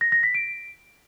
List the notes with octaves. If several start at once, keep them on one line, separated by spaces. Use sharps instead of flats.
A#6
A#6
B6
D7